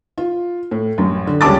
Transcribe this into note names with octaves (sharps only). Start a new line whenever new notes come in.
F4
A2
A1 F#2
D3
C#2 G3 C#4 A5 D6 A6